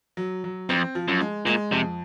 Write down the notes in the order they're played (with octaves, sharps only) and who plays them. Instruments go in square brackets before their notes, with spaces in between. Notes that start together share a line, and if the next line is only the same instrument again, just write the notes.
[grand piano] F#3
F#3
[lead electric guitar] F2 [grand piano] C4
[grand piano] F3
[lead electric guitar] F#2
[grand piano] G#3
[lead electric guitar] A#2 [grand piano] G#3
[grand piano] F2 [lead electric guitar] C3